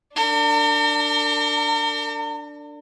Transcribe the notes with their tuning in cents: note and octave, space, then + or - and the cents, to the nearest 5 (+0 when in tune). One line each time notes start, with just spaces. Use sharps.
D4 +0 A#4 -45